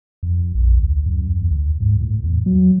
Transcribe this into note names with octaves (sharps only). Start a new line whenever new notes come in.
F2
A#1
D2
F#2
E2
D2
G#2
A2
E2
F#3